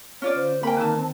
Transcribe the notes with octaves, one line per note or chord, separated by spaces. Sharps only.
C#4 F4 C#5 D5
D3 C5
A#3 C4 G5 G#5 B5
D#3 D#4 B4 A5 E6
C4